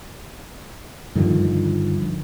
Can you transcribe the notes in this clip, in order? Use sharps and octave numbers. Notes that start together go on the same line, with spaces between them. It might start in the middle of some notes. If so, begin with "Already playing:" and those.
G2 D3 D#3 F3